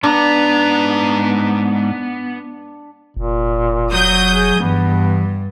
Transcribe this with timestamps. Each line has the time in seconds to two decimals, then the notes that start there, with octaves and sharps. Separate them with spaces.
0.03 G#2 B3 D4 A#5
3.17 F1 A#2
3.91 F#3 D#6 G6
4.30 G#4
4.60 G2 E3 B3